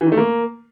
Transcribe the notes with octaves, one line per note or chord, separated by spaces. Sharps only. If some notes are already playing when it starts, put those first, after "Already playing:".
E3
D#3
A3
A#3